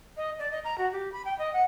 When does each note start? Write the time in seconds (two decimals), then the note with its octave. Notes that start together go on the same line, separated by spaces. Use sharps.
0.17 D#5
0.39 D5
0.51 D#5
0.64 A#5
0.78 F#4
0.92 G4
1.12 B5
1.25 G5
1.38 D#5
1.53 F#5